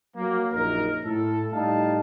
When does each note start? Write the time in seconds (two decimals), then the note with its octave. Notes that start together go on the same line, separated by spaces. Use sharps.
0.16 F#3 A#3
0.53 A#1 F#2 D#4 A#4
1.04 A2 A4
1.53 A2 G3 D#4 F5 A5